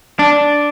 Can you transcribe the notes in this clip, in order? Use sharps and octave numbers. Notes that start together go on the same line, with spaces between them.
D4